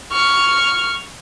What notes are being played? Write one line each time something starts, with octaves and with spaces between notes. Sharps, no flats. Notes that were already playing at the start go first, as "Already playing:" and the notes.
C#6 F6